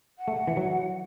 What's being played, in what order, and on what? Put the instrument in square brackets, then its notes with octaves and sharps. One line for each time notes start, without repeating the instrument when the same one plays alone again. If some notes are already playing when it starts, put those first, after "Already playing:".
[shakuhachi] F#5
[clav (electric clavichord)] A3
E3
F#3